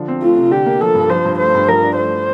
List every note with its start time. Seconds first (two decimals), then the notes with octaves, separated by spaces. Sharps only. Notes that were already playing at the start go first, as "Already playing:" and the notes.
Already playing: D3 F3
0.08 C4
0.22 A3 F4
0.37 C3
0.51 D3 G4
0.66 A#3
0.81 F3 A4
0.95 G2
1.10 F3 C5
1.25 G2
1.39 A3 C5
1.54 G2
1.68 F3 A#4
1.83 D4
1.97 A3 C5